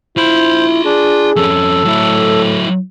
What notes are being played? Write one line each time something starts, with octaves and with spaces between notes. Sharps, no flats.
E4 F4 C5 B5
D4 G#4
F2 C#4 A4
A2 F#3 E4